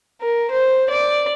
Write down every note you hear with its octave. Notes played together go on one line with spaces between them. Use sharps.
A#4
C5
D5